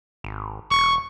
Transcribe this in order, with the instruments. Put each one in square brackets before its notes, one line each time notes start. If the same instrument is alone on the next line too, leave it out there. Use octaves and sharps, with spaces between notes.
[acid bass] G#1
[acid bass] E1 [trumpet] C#6